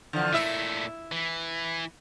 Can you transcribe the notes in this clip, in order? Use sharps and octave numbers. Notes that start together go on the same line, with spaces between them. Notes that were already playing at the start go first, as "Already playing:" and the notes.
D3 E3 F3
A#2 A3 E4 E5
E3